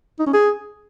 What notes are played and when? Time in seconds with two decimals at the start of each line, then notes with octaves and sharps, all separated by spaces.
0.20 D#4
0.27 C#4
0.33 G#4